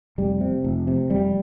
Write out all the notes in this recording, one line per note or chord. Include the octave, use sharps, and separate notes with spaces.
F1 G3
C3
F1
C3
F1 G3